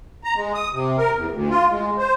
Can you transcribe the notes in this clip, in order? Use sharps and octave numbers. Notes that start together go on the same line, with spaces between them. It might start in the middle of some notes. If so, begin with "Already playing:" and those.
A#5
G#3
D#6
C3
A#4
E2
D2
F4
G#3
C5